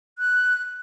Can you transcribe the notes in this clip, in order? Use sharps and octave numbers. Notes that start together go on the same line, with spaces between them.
F#6